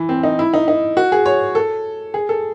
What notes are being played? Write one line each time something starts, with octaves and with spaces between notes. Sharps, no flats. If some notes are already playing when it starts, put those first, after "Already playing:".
Already playing: E3
C4
D#4
E4
D#4
D#4
F#4
G#4
C#5
A4
G#4
A4